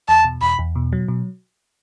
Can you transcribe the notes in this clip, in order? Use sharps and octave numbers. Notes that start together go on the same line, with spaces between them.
E2 A5
B2
E2 B5
E2
B2
F#3
B2